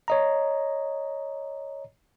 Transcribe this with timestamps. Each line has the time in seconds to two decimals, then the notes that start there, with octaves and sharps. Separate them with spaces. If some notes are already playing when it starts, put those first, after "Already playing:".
0.08 C#5 D#5 A#5